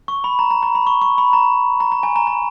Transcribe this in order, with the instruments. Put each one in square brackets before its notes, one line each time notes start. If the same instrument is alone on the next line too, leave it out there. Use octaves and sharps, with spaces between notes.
[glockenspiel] C#6
B5
A#5
A#5
A#5
B5
C#6
C#6
B5
A#5
A#5
A#5
G#5
A#5
A#5